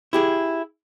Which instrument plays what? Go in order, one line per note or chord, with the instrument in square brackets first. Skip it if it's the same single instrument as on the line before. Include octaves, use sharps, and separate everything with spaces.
[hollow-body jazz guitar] E4 G4 G#4